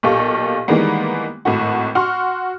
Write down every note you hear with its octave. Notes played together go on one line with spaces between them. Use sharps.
B1 A#2 G4 A4 F5 C#6
D#3 E3 G3 G#3 A#3 B3
G#1 A2 F#4
F#4 C6 C#6 F6